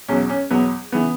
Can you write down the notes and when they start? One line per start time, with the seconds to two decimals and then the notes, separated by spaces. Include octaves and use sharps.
0.08 E2 B2 F#3 C#4
0.30 C#4
0.50 E2 B2 F#3 B3
0.92 C#3 E3 B3